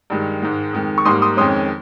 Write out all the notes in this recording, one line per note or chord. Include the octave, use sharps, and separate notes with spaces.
G2 D#3 G#3
G#2 D#3 G#3
F2 D#3 G#3
C#6
G#2 G3 A#3 C6 D#6
C6 D#6
F2 D#3 G#3 C#4 C6 D#6